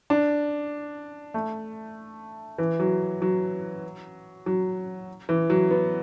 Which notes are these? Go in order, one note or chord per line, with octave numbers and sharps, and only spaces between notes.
D4
A3
E3
F#3
F#3
F#3
E3
F#3
B3